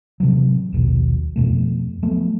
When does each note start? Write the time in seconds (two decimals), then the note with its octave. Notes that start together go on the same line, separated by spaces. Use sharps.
0.20 A2 C3 E3 F#3
0.72 A#1 D#2 B2
1.36 F2 B2 A3
2.03 F3 F#3 A3 B3